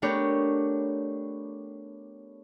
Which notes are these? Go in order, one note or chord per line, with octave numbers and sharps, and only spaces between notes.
A3 B3 D4 G4 A#4 C#5